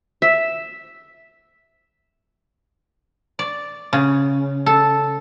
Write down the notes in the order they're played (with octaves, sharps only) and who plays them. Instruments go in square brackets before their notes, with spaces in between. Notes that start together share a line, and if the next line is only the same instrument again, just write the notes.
[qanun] E5
[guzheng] D5
C#3
A4